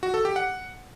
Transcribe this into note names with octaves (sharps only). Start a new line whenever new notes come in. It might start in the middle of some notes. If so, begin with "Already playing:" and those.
F#4
A4
G4
F#5